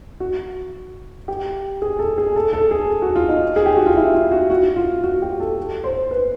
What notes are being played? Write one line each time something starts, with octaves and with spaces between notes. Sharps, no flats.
F#4
G4
G#4
A4
G#4
A4
A4
G#4
F#4
F4
D#4
G#4
G4
F#4
F4
E4
F4
F#4
F#4
F4
F#4
G4
A4
C5
B4